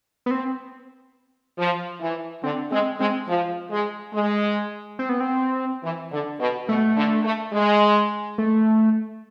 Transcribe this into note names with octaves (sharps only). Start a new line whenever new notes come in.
B3
C4
F3
E3
D3 C4
G#3 C4
G#3 C4
F3
G#3
G#3
C4
B3
C4
E3
D3
B2
B2 A3
D3
A3
G#3
A3